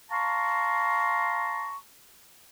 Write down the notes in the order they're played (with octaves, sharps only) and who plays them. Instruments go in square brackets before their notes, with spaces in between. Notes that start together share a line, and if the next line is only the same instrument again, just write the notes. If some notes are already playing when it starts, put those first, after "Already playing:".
[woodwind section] F5 A5 A#5 C6 C#6